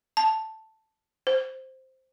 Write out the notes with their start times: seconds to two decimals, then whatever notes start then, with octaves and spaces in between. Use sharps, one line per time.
0.17 A5
1.27 C5